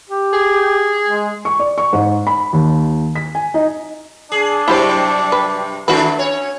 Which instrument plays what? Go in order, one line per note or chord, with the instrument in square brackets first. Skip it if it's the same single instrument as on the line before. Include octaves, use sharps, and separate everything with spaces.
[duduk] G4
[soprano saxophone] G#4
[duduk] G#3
[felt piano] C#6
D5
C#6
G#2
B5
D#2
B6
G#5
D#4
[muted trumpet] D4 [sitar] G#4
[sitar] G2 C3 F#3 [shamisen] E4 G4 C5
[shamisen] B4
[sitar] D#3 A3 [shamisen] D4 F#4 B4 [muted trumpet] E4
[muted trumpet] C#4 [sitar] C#5